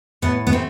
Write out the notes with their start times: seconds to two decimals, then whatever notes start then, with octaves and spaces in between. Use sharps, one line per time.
0.22 A2 B3
0.47 B3
0.52 A3 C4